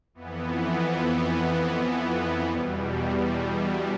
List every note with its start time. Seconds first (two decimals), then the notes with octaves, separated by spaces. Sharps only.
0.14 F2 E3 B3
2.44 E2 B2 G3